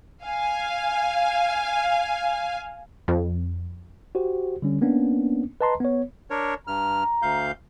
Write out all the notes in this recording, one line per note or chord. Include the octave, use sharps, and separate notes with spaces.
F5 G#5
F2
F#4 G4 C5
D3 G3 C#4
A#3 B3 C#4 D4
B4 D#5 A5 A#5 C6
B3 C#5
D4 A#4 C#5
G2 A#5 F6
D2 F5 G6